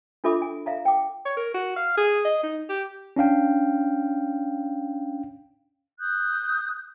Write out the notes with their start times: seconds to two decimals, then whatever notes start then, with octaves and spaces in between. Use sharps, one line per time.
0.24 D4 F4 A4 E5 B5 D6
0.42 G#5
0.66 E5 F5 A#5
0.85 G5 D6
1.26 C#5
1.37 A#4
1.54 F#4
1.76 F5
1.97 G#4
2.25 D#5
2.43 D#4
2.69 G4
3.16 C#4 D4 F5 G5
5.99 D#6 F#6 G6